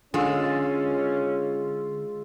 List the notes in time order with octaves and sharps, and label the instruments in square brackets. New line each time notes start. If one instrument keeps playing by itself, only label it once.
[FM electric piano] D3 E6 [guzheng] G#3 [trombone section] C#4 [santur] F4